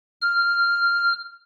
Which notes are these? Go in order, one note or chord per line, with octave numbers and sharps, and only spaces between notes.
F6